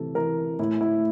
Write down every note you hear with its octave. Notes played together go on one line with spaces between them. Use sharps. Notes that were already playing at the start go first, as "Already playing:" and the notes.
Already playing: C3 E3 A4
E3 A#4
A2 E4
E4